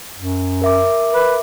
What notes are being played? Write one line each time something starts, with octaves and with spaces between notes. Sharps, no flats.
F#2
A#4 E5 D6
B4